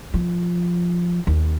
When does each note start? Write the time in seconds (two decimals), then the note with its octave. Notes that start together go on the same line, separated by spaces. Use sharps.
0.14 F3
1.27 D#2